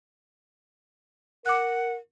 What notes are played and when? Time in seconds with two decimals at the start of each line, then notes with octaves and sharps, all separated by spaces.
1.46 A#4 F#5 D6 F#6